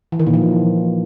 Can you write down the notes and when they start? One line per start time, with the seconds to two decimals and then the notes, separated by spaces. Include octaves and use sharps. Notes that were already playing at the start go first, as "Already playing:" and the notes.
0.12 E3
0.19 D#3
0.27 A#2
0.34 F3